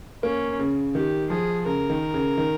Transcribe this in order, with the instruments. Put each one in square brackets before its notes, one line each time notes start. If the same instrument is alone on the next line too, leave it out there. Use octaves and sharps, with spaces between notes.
[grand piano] A#3 [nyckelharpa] C#4
[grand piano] C#3
[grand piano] D#3 [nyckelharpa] G4
[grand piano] F3 [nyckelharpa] G#4
[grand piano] C#3 [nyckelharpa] A#4
[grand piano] D#3
C#3
D#3